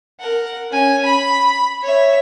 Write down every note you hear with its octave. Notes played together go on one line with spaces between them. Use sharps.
A#4 F#5
C#4 G#5
B5
C#5 E5